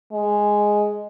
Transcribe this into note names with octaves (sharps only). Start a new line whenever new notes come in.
G#3